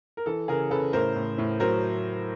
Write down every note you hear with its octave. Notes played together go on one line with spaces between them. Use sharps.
A#4
E3 A4
C#3 G#4 A#4
C#3 A4 B4
A2 A#4 C5
A2
A2
F#3 A#4 C5